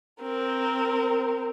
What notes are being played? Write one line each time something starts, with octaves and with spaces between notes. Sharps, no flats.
C4 A#4